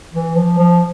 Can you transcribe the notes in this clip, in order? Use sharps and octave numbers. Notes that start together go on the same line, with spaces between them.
E3
F3
F3